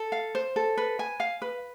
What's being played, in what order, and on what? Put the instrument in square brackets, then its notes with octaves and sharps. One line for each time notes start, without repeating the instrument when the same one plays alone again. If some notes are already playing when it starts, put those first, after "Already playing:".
Already playing: [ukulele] A4
F5
C5
A4
B4
G#5
F5
B4